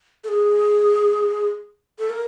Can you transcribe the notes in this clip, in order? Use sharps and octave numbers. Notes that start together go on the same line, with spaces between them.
A4
G#4
A4
A#4